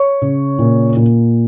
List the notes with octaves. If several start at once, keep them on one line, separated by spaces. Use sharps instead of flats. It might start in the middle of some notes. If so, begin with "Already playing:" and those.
Already playing: C#5 C#6
C#3
A#2
A#2